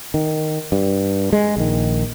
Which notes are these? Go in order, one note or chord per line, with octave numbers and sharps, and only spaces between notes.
D#3
G2
G#3
A#1 D#3